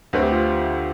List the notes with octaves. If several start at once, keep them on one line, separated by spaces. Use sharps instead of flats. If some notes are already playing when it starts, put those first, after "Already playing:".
D2 D3 A3 C4 B4
G4
F4